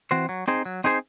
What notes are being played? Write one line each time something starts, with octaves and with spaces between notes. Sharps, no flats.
E3 C4 F#4 C5
F#3
C4 D#4 G#4 C5
F#3
C4 D#4 G#4 C5